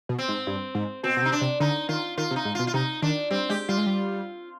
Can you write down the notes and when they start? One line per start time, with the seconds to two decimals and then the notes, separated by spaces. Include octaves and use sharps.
0.09 B2
0.19 C4
0.28 G#2
0.47 G2
0.75 G#2
1.03 B2 C4
1.17 B2
1.22 C3
1.25 D#4
1.32 D4
1.41 C3
1.60 D3 D#4
1.89 D#3 F4
2.17 D#3 F4
2.31 C3
2.36 D#4
2.45 G#2
2.55 F4
2.59 B2
2.67 F4
2.74 C3 D#4
3.02 D#3 D4
3.31 G3 C4
3.49 G#3 G4
3.69 G3 F4
3.78 G#3
3.86 G3